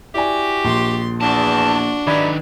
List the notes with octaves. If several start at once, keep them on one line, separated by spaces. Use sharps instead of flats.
E4 F#4 G4 D5 G#5
A#1 C6
E2 D4 F#4 A5
D#3 D#4 E4 G4 B4 D5 B5 G#6